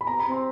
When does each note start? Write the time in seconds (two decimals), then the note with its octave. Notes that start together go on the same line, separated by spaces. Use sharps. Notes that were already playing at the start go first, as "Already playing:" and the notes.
0.01 B5
0.07 B3 A#5
0.19 B5
0.26 C4
0.32 C6